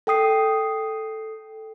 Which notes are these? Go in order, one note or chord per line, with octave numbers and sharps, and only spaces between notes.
A4 G5 D#6 C7